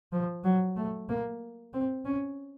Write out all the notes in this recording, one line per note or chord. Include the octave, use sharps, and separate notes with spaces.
F3
F#3
A3
A#3
C4
C#4